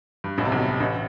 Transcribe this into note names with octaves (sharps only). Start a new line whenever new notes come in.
G2
A1 A2
C3
B1 B2
A1 A2